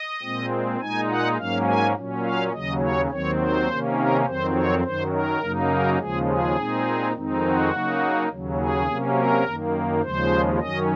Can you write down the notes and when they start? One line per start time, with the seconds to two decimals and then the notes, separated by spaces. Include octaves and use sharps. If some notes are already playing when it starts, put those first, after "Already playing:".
Already playing: D#5
0.23 A#2 G#3 C4
0.80 A#2 G#3 D#4 G#5
1.08 F#5
1.37 G#2 F#3 A#3 C#4 F5
1.67 G#5
1.95 A#2 F#3 C#4
2.24 F5
2.53 D#2 C#3 F#3 D#5
2.81 C#5
3.10 D#2 D#3 F#3 C4 C#5
3.39 C5
3.69 C3 D#3 A#3 C#4
3.96 A#4
4.26 F2 D#3 F#3 C4 C5
4.55 C#5
4.83 F#2 D#3 F#3 C5
5.12 A#4
5.40 F#2 C#3 F#3 A#3 D#4
5.70 A#4
5.98 D#2 C#3 F3 G#3 G#4
6.27 G#4
6.56 A#2 G#3 C4 D#4
7.13 F2 D#3 G#3 C4 D#4
7.43 F#4
7.72 C#3 F#3 A#3 D#4
8.29 D#2 C#3 F#3
8.57 G#4
8.86 C3 F#3 A#3 C#4
9.15 A#4
9.44 F#2 D#3 A#3
10.01 D#2 C#3 F3 G#3 C5
10.58 F#2 D#3 F#3 C#4 D#5